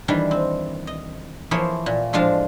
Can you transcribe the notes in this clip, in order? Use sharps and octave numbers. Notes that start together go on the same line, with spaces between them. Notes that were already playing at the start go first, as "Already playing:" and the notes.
D#3 E3 G3 D4
C4
D#5
E3 F3 A#3 G#4 C5 C#5
A#2
A2 F3 G#3 D4 F5 A5